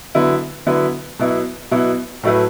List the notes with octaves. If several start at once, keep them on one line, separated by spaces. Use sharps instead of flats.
D3 F#3 B3 E4 B4
D3 F#3 B3 E4 B4
B2 F#3 B3 E4
B2 F#3 B3 E4
A2 F#3 A3 E4 B4